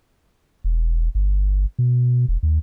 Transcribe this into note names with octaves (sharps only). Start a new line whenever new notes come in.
E1
G1
B2
E1
D#2